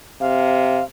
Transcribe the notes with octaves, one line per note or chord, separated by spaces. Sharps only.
C3 F5